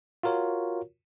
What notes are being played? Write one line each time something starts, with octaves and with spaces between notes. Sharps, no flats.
F4 F#4 A#4 C#5